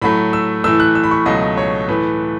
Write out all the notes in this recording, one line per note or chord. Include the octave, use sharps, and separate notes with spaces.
A2 F#3 A3 B5
E6
A2 E3 A3 E6
F#6
E6
B5
C#6
C#2 B2 F#3 A3 D#5
C#5
A2 E3 A3 B4